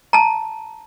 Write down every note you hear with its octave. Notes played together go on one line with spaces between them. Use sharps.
A5 A#5